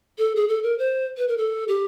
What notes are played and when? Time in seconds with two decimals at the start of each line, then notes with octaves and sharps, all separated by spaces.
0.18 A4
0.36 G#4
0.48 A4
0.63 A#4
0.78 C5
1.17 B4
1.28 A#4
1.37 A4
1.68 G4